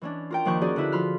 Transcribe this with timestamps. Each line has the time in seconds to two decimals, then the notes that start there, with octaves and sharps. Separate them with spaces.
0.01 E3 C#4 D4
0.31 F4 A#4 G5
0.45 D#2 D#3 F3 F#5 C#6 G6
0.61 C#4 D#4 F#4 G#4 D5
0.76 D3 E4 B4
0.92 F3 F4 B5 F6